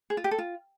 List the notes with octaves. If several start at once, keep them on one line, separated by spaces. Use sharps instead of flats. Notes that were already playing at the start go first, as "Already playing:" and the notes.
G#4
F4
G4
A4
F4